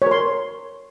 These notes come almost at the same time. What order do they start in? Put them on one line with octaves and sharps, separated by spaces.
C#5 A#4 C6